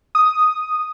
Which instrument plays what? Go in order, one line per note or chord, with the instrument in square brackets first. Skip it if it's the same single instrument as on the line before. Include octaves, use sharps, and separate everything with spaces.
[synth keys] D#6